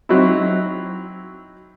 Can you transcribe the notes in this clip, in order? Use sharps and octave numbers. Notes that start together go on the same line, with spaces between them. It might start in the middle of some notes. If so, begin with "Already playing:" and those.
F#3 C4 D#4 E4